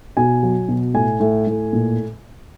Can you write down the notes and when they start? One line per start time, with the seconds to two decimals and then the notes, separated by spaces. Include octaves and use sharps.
0.17 B2 G#5
0.43 F#3
0.69 B2
0.94 A2 G#5
1.20 A2
1.47 A2
1.73 A#2